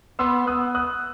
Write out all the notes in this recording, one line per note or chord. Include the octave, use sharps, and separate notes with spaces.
B3 C6 E6
B3 D#6 F#6
D#6 F#6